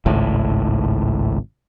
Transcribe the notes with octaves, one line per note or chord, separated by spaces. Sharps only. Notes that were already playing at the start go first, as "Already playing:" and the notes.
G#1 C#2 A2